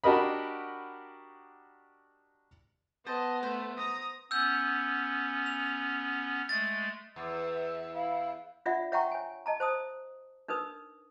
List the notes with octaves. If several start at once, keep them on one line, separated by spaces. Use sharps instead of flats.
D4 F#4 G4 A#4 D#5 B5
B3 C5 D#5 A5
A3 C5
A#5 D#6
B3 C#4 E6 G6
F7
G#3 A3 A6
E2 E5
E4 F5
D4 F4 D5 E5 F#5
C#5 E5 F#5 G5 A#5 C#6
C#5 G#5
D#5 A5 A#5
C5 A5 D#6
D4 D#4 A#4 B4 D#6